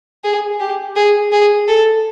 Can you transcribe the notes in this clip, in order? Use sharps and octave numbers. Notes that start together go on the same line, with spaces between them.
G#4
G4
G#4
G#4
A4